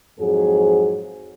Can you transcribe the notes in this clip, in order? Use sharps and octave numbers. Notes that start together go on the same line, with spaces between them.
F2 G#2 F#3 G#4